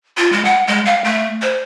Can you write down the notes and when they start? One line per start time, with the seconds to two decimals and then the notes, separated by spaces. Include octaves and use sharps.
0.17 F4
0.32 G#3
0.45 F#5
0.67 G#3
0.85 F5
1.04 A3
1.42 C5